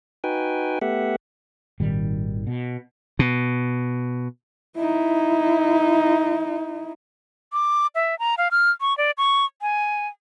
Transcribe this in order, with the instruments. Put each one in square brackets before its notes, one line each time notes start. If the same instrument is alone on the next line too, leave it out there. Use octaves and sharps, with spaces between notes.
[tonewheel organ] D#4 F#4 B4 G5 G#5
A3 B3 G4 E5 F#5
[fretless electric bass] G#1 A#2 D#3 G3
B2
[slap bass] B2
[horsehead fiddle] D#4 E4
[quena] D6
E5
A#5
F5
F6
C#6
D5
C#6
G#5